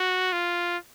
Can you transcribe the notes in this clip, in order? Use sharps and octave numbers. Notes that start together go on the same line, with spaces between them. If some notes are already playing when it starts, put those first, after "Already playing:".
Already playing: F#4
F4